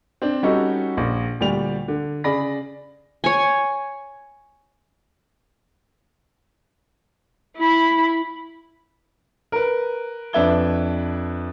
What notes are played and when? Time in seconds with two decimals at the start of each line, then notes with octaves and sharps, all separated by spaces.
0.22 C4 D4
0.43 G3 C#4 D#4 F#4 A4
0.97 A#1
1.40 D2 A#2 G3 D5 F7
1.88 D3
2.24 C#3 G#4 D5 B5 A#6
3.24 C#5 G#5
7.57 E4 B5
9.52 A#4 B4
10.33 F2 D4 B4 E5 G#6 G7